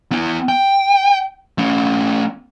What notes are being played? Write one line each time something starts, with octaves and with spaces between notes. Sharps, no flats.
B3 E4
G5
A3 C#4